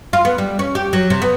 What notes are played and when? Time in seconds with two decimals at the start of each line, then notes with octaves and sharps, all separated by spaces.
0.13 F4
0.25 B3
0.38 G3
0.59 C#4
0.75 G4
0.93 F#3
1.10 C3
1.22 B3